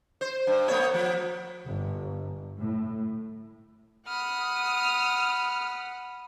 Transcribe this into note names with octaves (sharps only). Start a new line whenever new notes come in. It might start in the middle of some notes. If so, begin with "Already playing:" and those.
C5
G2
A3 B3 C#5
F3
G1
A2
F#5 B5 D#6 F6